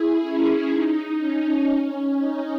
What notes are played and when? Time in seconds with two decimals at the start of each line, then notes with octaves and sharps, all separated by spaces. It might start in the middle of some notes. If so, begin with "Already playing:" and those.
Already playing: E4 G#4
0.21 C#4 E4
0.70 D#4
1.20 C#4
2.19 D#4